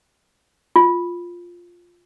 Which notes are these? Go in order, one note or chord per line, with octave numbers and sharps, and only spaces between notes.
F4